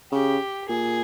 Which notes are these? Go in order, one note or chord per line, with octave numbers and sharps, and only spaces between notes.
C#3 G4
A#2 G#4